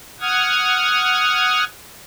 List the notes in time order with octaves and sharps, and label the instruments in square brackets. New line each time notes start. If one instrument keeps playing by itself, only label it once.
[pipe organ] F#5 D#6 F6 G#6